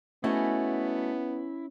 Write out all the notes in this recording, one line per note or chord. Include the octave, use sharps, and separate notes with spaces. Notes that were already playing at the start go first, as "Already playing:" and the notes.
A3 B3 C#4 E4 F#4 D#5